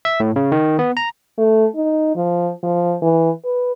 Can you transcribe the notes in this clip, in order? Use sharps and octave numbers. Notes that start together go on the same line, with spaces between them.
E5
A2
C#3
D#3
B3
A#5
A3
D#4
F3
F3
E3
B4